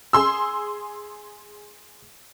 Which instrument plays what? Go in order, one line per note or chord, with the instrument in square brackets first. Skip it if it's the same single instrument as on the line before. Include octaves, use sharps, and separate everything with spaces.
[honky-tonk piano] G#4 C6 E6